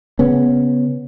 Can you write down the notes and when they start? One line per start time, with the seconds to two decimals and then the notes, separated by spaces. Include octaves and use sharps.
0.19 C#3 B3 C#4